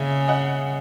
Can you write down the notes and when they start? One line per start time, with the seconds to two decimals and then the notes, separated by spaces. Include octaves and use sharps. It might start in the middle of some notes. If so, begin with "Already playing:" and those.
Already playing: C#3 E5 G#5
0.28 D#5 F#5